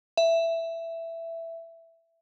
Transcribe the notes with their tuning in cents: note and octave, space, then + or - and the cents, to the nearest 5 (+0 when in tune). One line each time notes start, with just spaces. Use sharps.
E5 +10